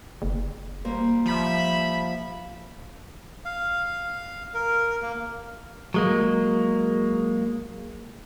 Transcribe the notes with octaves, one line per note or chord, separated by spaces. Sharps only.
F#1
G3 A#3 C5
F3 E5 B5
F5
A#4
A#3
F#3 G#3 A#3